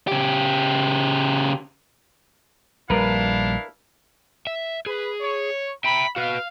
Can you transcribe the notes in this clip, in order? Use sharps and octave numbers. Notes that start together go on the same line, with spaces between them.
C#3 G4
A#1 G3 D4 E4 A#4 B4 F5
E5
G#4 B4
C#5
E5 G5 A#5 B5
F#4 B4 F5